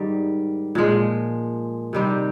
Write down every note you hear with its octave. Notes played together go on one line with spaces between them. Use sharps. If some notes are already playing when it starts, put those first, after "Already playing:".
Already playing: G#2 D#3 G3
A#2 F3 G#3
C3 D#3 G3 C4